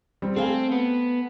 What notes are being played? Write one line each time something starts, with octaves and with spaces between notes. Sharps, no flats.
G3 C4
A3 C4 F5 G#5
B3